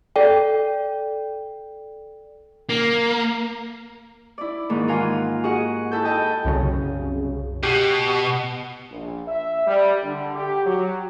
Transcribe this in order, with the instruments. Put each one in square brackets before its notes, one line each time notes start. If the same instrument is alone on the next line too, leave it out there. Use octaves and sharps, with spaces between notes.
[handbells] A4 D5 G5
[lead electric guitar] A#3
[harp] E4 D5
G#2 D#3 E3 A#3
F4 A#4 F5 F#5 G#5 A#5
F#4 G#4 D#5 F#5
E4 A4 G6
D#5 G5 A5
[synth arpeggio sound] C2 F#2 C#3
[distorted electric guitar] B2 [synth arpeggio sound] G4
[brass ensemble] A#1
E5
G3
D3
G4
F#3